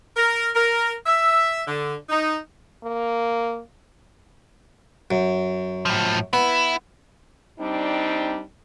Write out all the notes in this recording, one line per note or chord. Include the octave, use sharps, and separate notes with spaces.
A#4
A#4
E5
D3
D#4
A#3
F#2
A2 F3
B3 E4
G3 C4 D4 D#4